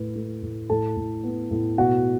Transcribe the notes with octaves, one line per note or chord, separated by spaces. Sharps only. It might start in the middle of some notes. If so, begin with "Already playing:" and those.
Already playing: A2 A3 B4
A3
A2
A2 A4 A5
A2
B3
A2
B2 F#4 F#5